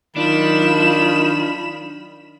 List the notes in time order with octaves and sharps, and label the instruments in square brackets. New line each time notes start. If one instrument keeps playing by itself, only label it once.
[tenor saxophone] D#3 [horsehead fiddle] F#3 F4 [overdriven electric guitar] D4 [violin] B5 E7